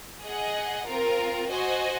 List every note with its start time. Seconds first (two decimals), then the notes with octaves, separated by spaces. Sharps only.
0.23 G#4 D#5 F#5
0.86 C4 F4 A#4
1.50 F#4 C5 D#5 G#5